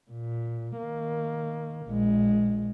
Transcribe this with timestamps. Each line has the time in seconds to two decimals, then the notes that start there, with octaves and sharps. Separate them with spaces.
0.11 A#2
0.78 D#3 A#3
1.87 A#1 G#3